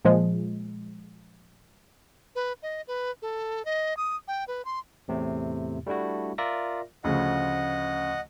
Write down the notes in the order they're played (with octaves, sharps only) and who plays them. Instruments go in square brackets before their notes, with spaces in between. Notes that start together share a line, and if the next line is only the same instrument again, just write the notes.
[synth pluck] A#2 F3 G#3
[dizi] B4
D#5
B4
A4
D#5
D#6
G5
B4
C6
[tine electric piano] E2 A2 C3 A3
G3 A3 D4 E4 F#4
F4 A#4 D5 E5 A#6
[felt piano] D2 C#3 F3 [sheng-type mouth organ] D#5 F#5